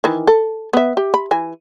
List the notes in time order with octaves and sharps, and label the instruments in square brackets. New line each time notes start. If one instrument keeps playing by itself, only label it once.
[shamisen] D#3 E3
A4
B3 E5
G4
B5
E3 G#5